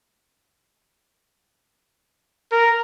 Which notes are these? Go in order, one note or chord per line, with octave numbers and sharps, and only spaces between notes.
A#4